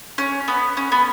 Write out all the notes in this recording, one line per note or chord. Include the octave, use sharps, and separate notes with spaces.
C#4
B3
C#4
B3